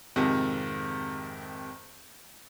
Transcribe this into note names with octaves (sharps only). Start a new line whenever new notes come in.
F2 G#2 C3 D#3